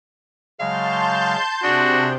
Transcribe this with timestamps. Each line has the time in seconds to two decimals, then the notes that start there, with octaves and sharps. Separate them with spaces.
0.60 C#3 F#3 G#3 F5 A5 C6 G6
1.63 C3 D4 F#4 G#4 G5 C6